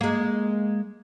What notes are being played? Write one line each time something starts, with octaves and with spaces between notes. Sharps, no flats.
G#3 A#3